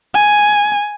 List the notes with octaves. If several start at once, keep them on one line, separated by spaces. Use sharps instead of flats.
G#5